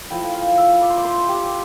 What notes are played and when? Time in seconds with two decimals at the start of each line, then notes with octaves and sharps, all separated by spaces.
0.10 F3 A3 E4 G5
0.34 F5
0.58 E5
0.81 D5
0.89 C5
0.97 D5
1.05 C5
1.29 G4